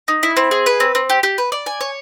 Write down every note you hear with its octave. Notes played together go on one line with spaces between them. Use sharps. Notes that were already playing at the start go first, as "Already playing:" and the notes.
D#4
E4
C4
G#4
B4
C4
C4
G4
G4
B4
D5
G#5
C#5